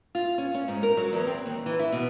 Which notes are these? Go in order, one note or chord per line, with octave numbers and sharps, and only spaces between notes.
F4
C#4
C#4
G#2
A#4
F#3
E2
C4
D#2
E3
E4
B2